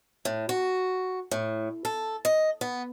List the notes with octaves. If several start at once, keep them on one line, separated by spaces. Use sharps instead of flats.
A2
F#4
A2
A4
D#5
B3